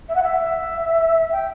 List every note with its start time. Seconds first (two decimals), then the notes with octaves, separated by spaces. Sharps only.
0.08 E5
0.15 F#5
0.22 E5
1.32 G5